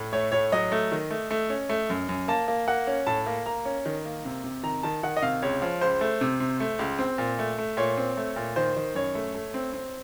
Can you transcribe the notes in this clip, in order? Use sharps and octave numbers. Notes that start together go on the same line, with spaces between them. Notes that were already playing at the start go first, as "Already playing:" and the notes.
Already playing: A2
A3 C#5
A2 C#5
F#3 D#5
A3
D#3
A3
A3
C#4
A3
F#2
F#2
A#3 A5
A#3
A#3 F#5
C#4
A2 A5
A#3
A#3 A#5
C#4
D#3
A#3
C3
C3
D#3 A#5
D#3 A5
D#3 F#5
D#5
C3 F5
C#2 C#5
F3
C#2 C5
A3
C3
C3
A3
C#2
C4
A#2
A3
A3
A#2 C#5
C4
A3
A#2
D#3 C5
D#3
F#2 C#5
A3
A3
C4
C4